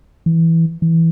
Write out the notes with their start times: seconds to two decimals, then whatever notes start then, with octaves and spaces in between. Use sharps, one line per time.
0.26 E3
0.82 E3